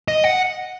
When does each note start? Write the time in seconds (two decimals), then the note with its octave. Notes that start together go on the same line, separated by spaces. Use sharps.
0.08 D#5
0.24 F#5